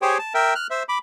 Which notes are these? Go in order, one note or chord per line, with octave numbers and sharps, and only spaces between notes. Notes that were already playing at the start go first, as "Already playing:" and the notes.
G4 G#4 C5 C#5 G5
A5
A#4 E5 G5
F6 F#6
C5 E5
B5 D6